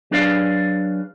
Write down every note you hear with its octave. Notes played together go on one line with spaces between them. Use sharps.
F#3 D4 G#4 B4 D5 F5